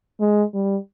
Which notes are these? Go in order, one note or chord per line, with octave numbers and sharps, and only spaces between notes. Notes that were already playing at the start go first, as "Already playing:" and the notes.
G#3
G3